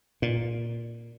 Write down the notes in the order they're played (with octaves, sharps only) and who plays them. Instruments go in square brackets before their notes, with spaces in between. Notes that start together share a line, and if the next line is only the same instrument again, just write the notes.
[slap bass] A#2